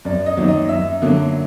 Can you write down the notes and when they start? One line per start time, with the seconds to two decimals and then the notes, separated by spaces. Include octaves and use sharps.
0.05 F#2 D5
0.26 D#5
0.37 D#3 F#3 A#3
0.48 D#5
0.69 F#2 E5
1.02 D3 F#3 A#3